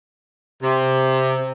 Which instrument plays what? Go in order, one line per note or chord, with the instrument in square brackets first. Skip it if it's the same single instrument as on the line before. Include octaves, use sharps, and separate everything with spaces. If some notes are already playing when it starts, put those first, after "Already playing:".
[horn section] C3